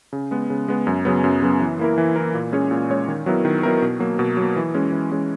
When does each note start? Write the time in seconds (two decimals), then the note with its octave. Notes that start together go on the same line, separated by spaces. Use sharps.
0.13 C#3
0.31 G#3 B3
0.50 C#3
0.68 G#3 B3
0.87 F#2
1.05 C#3 F#3 B3
1.24 F#2
1.42 C#3 F#3 B3
1.61 E3
1.79 A#3 E4 A#4
1.98 E3
2.16 A#3 E4 A#4
2.34 A#2
2.52 G#3 C#4 G#4 C#5
2.71 A#2
2.90 G#3 C#4 G#4 C#5
3.08 D#3
3.26 F#3 B3 E4 A#4
3.45 D#3
3.63 F#3 B3 E4 A#4
3.82 B2
4.00 F#3 A#3
4.19 B2
4.37 F#3 A#3
4.56 E3
4.74 G#3 C#4
4.92 E3
5.11 G#3 C#4